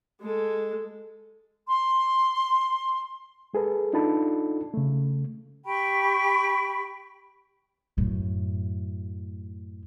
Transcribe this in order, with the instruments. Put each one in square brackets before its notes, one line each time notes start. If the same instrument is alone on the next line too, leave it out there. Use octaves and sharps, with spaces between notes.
[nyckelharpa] G#3 A4
[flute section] C6
[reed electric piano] G#3 G#4 A4 B4
D4 D#4 F4 A4 A5 B5
C#3 A3
[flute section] G4 G5 B5 C#6
[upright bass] F#2 A2